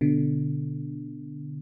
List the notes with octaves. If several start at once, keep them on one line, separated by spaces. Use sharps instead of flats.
B2 D3